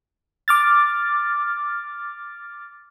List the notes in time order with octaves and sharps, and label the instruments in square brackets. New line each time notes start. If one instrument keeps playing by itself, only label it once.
[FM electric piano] D6 F6 A6